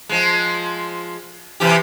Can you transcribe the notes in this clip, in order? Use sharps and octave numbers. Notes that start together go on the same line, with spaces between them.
F3 G#3
C3 E3 G4